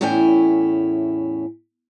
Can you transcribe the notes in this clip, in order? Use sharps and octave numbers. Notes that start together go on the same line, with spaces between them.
E2 A2 C#4 E4 G5 G#5